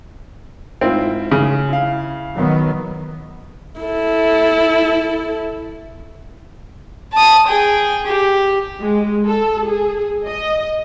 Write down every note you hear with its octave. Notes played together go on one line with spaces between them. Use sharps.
G#2 C4 E4 F4
C#3
E4 F5
D#3 F#3 B3
E4 A4
A5 D#6
G#4 G5
G4
G#3
A4
G#4
D#5